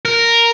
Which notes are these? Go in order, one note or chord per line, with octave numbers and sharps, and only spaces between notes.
A#4